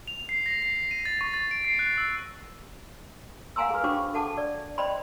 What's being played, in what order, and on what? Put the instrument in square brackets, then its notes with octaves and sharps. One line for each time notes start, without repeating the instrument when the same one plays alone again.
[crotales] F7
C7
A#6
C7
D#7
A6
C#6
A6
D7
C7
F#6
E6
[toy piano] F5 F#5 G#5 A#5 C6 E6
G#4 B4
D4 F#4 C5 G5 C#6 D6
A4 F#5 A5 D6
D5
C5 D5 D#5 G5 B5 C6